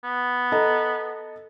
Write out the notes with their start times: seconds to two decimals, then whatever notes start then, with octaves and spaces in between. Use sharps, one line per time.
0.04 B3
0.52 A4 D#5 A#5